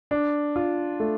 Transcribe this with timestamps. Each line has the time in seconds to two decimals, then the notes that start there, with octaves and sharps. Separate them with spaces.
0.11 D4
0.56 F4
1.00 A3